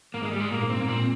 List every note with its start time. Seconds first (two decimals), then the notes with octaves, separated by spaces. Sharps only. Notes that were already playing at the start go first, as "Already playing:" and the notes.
0.14 G#2 A#3
0.23 G#3
0.31 G3
0.40 G#3
0.51 A#2 A#3
0.63 G#2
0.70 C4
0.75 G2
0.80 A#3
0.88 A#2 C4